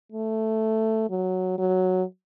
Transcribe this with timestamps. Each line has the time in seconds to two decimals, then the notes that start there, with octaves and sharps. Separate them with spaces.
0.12 A3
1.10 F#3
1.58 F#3